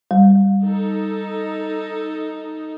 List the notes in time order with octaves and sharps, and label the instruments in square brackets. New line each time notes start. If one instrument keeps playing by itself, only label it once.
[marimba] G3
[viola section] D#4 A4